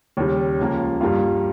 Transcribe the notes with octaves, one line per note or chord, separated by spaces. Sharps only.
D#2 C#3 G3
C#2 C#3 F3 A#3
G2 G3 A#3 F4